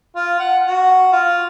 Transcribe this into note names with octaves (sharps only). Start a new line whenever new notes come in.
F4
F#5
F#4
F4